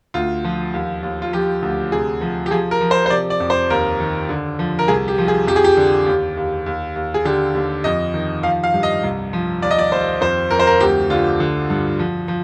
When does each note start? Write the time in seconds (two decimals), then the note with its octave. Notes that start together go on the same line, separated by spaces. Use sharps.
0.14 D2 F4
0.44 F3
0.74 D#2
1.03 D#2
1.22 F4
1.33 F3 G4
1.62 D2
1.92 C3 G#4
2.21 F3
2.46 G4
2.51 F3 G#4
2.71 A#4
2.81 F3
2.91 C5
3.06 C5
3.10 C3 D5
3.30 D5
3.40 F2
3.50 C5
3.70 D#2 A#4
4.00 D#3
4.29 D3
4.59 F3
4.79 A#4
4.88 C2 G#4
5.08 G4
5.18 F3
5.28 G#4
5.48 F2 G4
5.56 G#4
5.64 G4
5.77 D3
6.06 D#2
6.37 D#2
6.66 D#2
6.96 D#2
7.14 G#4
7.25 D3 G4
7.54 D#2
7.84 F2 D#5
8.14 D#3
8.43 F3 F5
8.64 F5
8.74 G2
8.83 D#5
9.03 C2
9.33 F3
9.62 D#2 D5
9.71 D#5
9.79 D5
9.92 D#2 C5
10.21 F2 C5
10.51 F2 A#4
10.59 C5
10.67 A#4
10.80 D2 G4
11.10 D3 F4
11.40 D3
11.70 G2
11.99 F3
12.28 F3